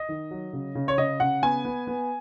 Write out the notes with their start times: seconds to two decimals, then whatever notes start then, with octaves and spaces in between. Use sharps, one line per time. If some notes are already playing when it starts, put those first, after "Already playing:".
Already playing: D#5
0.09 D#3
0.31 F#3
0.53 C#3
0.75 C#3
0.88 C#5
0.98 C#3 D#5
1.20 C#3 F#5
1.43 B3 G#5
1.65 B3
1.87 B3